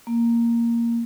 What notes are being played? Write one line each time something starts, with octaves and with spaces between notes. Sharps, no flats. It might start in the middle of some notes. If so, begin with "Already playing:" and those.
A#3